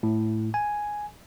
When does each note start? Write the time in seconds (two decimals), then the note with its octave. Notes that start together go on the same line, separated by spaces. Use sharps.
0.03 A2
0.54 G#5